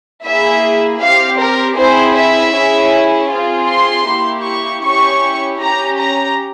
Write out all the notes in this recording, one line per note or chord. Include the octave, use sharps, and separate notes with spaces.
A#3 E4 G#4 E5
C4 G4 F5
A#4
C4 E4 G#4 C5
E5
C#4 E4 G#4
C4 F4 G#4
C6
A#3 E4 G4
C#6
C#4 E4 G4 C#6
C#4 G4 A#5
A#5